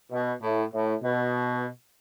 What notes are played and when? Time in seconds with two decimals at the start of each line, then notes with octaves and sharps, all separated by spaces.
0.11 B2
0.42 A2
0.73 A2
1.03 B2